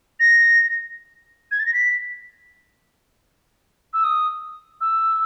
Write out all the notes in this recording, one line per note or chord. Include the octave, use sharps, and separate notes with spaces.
A#6
G#6
A6
A#6
B6
E6
D#6
E6